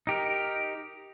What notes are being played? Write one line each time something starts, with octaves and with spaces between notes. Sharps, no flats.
D#4 G4 A#4